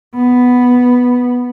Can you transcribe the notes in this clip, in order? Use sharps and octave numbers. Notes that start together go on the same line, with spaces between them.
B3